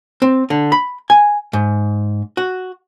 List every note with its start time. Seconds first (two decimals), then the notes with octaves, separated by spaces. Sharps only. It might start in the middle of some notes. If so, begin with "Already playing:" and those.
0.22 C4
0.50 D3
0.72 B5
1.10 G#5
1.53 G#2
2.37 F#4